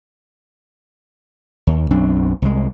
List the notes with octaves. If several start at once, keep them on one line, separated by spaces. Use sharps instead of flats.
D#2
B1 F#2 C4 D4
C2 G#3